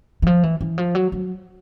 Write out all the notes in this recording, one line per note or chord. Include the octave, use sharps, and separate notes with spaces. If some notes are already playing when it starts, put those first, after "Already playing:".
E3
F3
E3
E3
F3
F#3
F#3